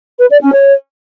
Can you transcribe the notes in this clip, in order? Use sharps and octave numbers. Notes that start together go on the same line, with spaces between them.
B4
D5
C#4
C#5